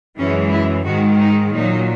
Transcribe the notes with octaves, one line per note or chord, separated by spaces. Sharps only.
F#2 E3 G#3 C#4
E4
G#2 D#3 G#3 F#4
D#4
A#2 F#3 D#4